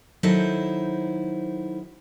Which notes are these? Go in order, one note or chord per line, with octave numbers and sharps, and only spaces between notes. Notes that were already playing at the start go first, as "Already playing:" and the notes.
D#3 F#3 D#4 E4 A4 C5